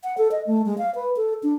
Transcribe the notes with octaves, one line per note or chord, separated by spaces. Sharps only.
F#5
A4
D#5
A3
G#3
F5
B4
A4
D4